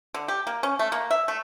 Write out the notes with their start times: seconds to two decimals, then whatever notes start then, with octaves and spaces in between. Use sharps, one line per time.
0.14 D3
0.28 G4
0.47 A#3
0.63 C#4
0.79 A3
0.92 A#3
1.11 E5
1.28 A3